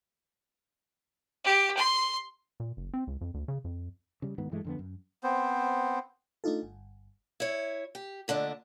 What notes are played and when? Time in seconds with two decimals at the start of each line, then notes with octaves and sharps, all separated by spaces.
1.45 G4
1.77 C6
2.60 A#2
2.77 F#1
2.94 C4
3.07 C#2
3.21 F2
3.34 D2
3.48 C#3
3.64 F2
4.22 C#3 G3
4.38 D2 G#2 D#3 B3
4.51 G2 E3 G#3 A3
4.64 F2 D3 B3
4.79 F#2
5.23 B3 C4 C5
6.44 A3 D4 D#4 F4 A4
6.63 G1
7.40 E4 C#5
7.95 G4
8.28 A#2 D3 A3 D4 D#5